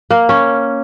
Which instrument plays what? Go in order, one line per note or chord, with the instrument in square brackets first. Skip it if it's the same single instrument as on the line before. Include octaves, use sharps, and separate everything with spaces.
[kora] A#3
C#4